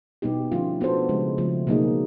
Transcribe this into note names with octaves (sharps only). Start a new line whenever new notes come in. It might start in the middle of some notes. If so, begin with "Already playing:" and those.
B2 G3 B3 D#4 G4
D3 F3 A3 C#4 F4
B3 D4 F#4 A4 C5
C#3 F3 G#3
C#3 F3 A3
B2 F#3 A#3 D#4 G#4